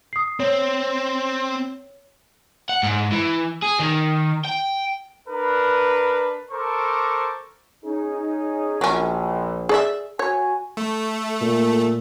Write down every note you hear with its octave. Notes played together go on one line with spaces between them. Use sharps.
D#6 C7
C4 C#5
F#5
G#2
E3
G#4
D#3
G5
D4 A#4 B4
A4 A#4 C5 C#6 D6
C#4 D#4 G#4
A#1 F#3 C#4
G#4 D5 E5
F#4 C#5 G#5
A3
A#2